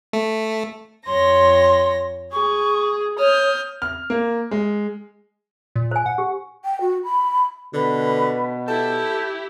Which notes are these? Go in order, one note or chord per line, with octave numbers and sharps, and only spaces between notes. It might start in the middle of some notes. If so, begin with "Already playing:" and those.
A3
F2 C#5 C6 A#6
G#4 C#6
C#5 D#6 F6 G6
F6
A#3
G#3
A#2
C5 G#5
F#5
G4
G5
F#4
B5
B2 D3 B4
E4 G4 A4 G6